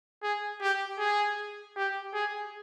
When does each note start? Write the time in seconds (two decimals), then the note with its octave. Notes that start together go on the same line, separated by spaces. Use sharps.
0.23 G#4
0.61 G4
0.99 G#4
1.77 G4
2.14 G#4